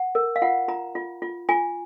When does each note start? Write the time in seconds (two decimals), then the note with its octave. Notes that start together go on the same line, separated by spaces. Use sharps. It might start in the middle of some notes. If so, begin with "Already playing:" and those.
Already playing: F#5
0.15 A#4
0.36 F5
0.42 F4 F#5
0.68 F4 A#5
0.95 F4
1.22 F4
1.49 F4 G#5